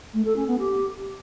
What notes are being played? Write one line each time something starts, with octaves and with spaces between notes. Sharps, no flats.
A3
A4
C#4
B3
G4